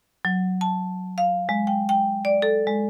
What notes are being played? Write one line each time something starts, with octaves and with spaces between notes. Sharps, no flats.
F#3
A5
F5
G#3
G5
G5
D5
A4
G#3